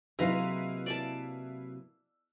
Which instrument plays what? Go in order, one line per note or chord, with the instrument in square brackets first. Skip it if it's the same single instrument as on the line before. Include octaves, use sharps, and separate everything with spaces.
[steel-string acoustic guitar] C3 F#3 A#3 [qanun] G#3 A#5 [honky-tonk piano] E4 B4 F5
[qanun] D5 G#5 A5